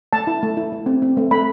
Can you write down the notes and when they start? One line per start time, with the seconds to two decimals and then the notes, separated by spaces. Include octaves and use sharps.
0.13 A3 A5
0.27 E4
0.43 A3
0.57 E4
0.73 A3
0.86 C4
1.02 C4
1.17 A3
1.31 A3 B5